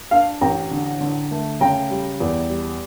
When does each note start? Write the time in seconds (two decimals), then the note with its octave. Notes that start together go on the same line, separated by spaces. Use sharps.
0.11 D4 F5
0.41 A1 G5 A#5
0.71 D3
1.01 D3
1.31 A3
1.61 C#3 G5 A#5
1.91 G3
2.20 E2
2.50 G3